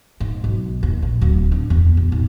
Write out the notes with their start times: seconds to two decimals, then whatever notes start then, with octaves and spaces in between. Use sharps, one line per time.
0.20 G#2
0.44 B1
0.83 D#2
1.02 A#1
1.21 D1
1.52 D4
1.70 E2
1.97 E2
2.12 G#2